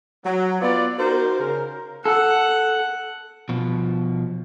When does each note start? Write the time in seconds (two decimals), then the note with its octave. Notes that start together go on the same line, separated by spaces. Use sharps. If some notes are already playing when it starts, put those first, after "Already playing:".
0.25 F#3
0.61 B3 F4 D5
0.98 D#4 F#4 A#4 C5
1.39 C#3 A#4
2.05 A4 F#5
3.49 B2 F3